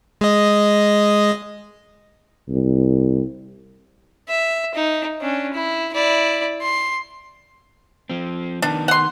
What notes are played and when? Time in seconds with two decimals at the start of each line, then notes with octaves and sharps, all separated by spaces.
0.21 G#3 D#5
2.49 C2
4.29 E5
4.75 D#4
5.21 C#4 D4
5.53 E4
5.93 E4 D5
6.61 C6
8.10 F3 C4
8.62 D#3 B3 D4
8.88 F#5 C6